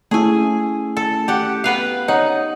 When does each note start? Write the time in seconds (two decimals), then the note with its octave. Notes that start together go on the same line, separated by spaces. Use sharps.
0.11 A3 C#4 E4 G#4 G#5
0.97 A4
1.28 G4 F#5
1.64 B3 B4 F5
2.08 D#4 C#5 F#5